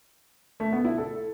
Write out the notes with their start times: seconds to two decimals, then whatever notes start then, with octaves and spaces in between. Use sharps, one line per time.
0.60 A3
0.72 B3
0.85 E4
0.98 A4